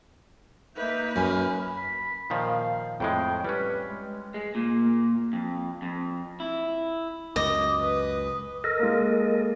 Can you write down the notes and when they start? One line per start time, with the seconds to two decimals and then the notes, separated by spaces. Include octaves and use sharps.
0.75 A#3 D#4 B4 E5 G6
1.16 F#2 G#5 B5 F6
1.77 B5
2.30 A#2 D#3 F3 F5
3.00 F2 A2 G#3 G5
3.44 G3 C#4 B4
3.89 G#3
4.34 G#3
4.55 A#2
5.33 F2
5.82 F2
6.40 E4
7.36 C#2 F#2 D#5 D6
7.82 B4 D#6
8.64 A4 A#4 D#5
8.80 G#3 A#3